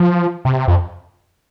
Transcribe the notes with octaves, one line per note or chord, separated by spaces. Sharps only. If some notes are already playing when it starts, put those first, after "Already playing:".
Already playing: F3
C3
F2